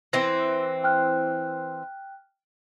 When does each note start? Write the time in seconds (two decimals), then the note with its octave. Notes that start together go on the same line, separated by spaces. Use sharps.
0.13 E3 C4 A#6
0.84 G5 F6 F#6